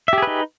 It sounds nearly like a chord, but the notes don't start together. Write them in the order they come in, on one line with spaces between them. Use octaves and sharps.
E5 G4 G#4 B4 D#4